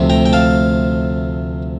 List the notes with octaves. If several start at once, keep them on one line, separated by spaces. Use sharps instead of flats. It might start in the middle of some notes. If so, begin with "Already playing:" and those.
Already playing: D2 C3 F3 A3
G5 A#5
G5
F5 A5